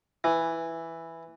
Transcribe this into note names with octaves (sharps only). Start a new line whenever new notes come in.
E3